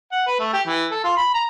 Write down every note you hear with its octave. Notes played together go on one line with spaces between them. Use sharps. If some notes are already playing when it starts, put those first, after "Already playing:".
F#5
B4
A3
G4
E3
A4
F4
B5
A#5